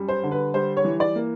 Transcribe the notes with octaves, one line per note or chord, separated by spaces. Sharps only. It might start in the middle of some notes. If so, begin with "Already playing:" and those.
Already playing: F#2 G3
C5
D3
B4
G3 C5
C#5
E3
D5
A#3